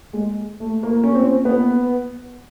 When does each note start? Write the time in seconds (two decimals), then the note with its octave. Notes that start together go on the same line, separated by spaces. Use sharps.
0.13 G#3
0.60 A3
0.83 A#3
1.04 C#4
1.15 C4
1.45 B3